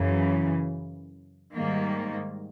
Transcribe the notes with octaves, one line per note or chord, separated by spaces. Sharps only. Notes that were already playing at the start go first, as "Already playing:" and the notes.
Already playing: F#2 C#3 E3
G#2 D#3 G3 A#3